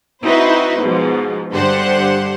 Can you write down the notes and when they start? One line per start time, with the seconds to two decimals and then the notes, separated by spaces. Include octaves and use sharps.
0.24 C4 D#4 E4 F#4 B4 C5
0.83 G#2 B2 F3 G#3
1.52 G2 D3 G4 C5 F#5